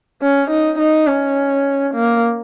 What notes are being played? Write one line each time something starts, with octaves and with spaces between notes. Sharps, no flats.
C#4
D#4
D#4
C#4
A#3